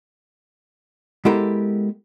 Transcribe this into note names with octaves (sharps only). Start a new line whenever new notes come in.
G#3 B3 E4 G4 A4 A#4